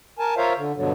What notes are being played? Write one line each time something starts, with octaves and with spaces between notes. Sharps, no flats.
A#4 G#5 A5
F4 A#4 C5 C#5 E5 F5
D3
G2 B2 D3 F#3